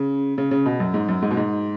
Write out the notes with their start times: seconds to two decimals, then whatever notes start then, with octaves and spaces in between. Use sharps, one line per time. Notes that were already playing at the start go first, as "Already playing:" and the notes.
Already playing: C#3
0.38 C#3
0.51 C#3
0.66 B2
0.80 F#2
0.94 G#2
1.08 F#2
1.22 G#2
1.30 B2
1.37 G#2